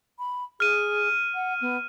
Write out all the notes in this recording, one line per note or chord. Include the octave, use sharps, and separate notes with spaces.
B5
G#4 F6 D#7
F#5
B3